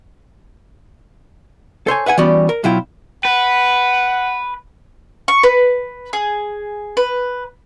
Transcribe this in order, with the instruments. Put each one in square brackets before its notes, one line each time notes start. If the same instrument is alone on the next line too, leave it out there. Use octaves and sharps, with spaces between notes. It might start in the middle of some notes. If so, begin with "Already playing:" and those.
[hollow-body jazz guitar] A4 C5 C#5 G#5
B4 E5 F#5 G#5
E3 G3 B3 C#4 F#4 D5
A#4
B1 F#3 E4 F4 G5
[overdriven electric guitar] B4 [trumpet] F#5
[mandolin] C#6
B4
G#4
B4